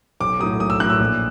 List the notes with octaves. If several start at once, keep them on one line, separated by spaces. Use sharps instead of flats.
B1 D6
A2 F#3 D#6
B1 D#6
E6
A2 F#3 F#6
E6
A#1